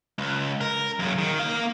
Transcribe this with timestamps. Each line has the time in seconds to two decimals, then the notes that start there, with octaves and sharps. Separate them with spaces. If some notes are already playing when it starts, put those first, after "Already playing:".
0.18 C#2
0.61 A#4
0.99 F#2 C#3
1.18 D#3
1.39 A#3 F5